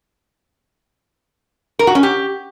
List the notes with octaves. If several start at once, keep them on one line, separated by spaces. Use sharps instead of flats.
A#4
F#4
C#4
G4